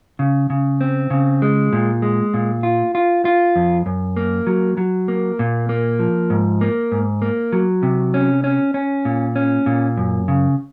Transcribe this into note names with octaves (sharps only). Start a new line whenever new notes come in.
C#3
C#3
C4
C#3
G#3
A#2
G#3
A#2
F4
F4
F4
F2
F#2
A#3
F#3
F#3
A#3
A#2
A#3
F3
G#2
A#3
G#2
A#3
F#3
C3
C#4
C#4
C#4
A#2
C#4
A#2
F#2
C#3